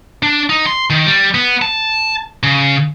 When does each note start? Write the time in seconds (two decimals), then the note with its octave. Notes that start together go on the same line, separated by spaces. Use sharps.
0.23 D4
0.50 D#4
0.66 C6
0.90 D#3
1.07 G3
1.34 B3
1.62 A5
2.43 C#3